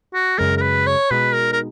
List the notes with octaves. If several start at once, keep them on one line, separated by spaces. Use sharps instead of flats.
F#4
F#2 C#3 G#3 A#4
A#4
B4
C#5
B2 G#3 D#4 B4
A#4
A#4